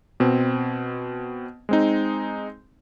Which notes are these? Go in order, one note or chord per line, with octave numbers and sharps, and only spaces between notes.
B2 C4
G#3 C4 D#4